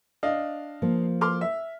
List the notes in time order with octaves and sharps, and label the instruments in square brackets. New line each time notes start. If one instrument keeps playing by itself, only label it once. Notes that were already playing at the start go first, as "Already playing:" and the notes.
[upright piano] D4 D#5 F5
[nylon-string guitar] F3 A#3
[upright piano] C6 D6 F6
E5